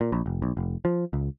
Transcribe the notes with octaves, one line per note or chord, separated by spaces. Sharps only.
A#2
A#1
F1
B1
F1
F3
C#2